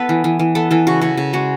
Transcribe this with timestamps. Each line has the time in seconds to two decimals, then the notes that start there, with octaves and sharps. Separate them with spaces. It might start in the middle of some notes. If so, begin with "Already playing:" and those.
Already playing: B3 A4 B4
0.09 E3
0.24 E3
0.39 E3
0.55 B3 A4
0.71 E3 A4
0.87 C#3 F#4
1.01 C#3 F#4
1.17 C#3
1.33 G#3 F#4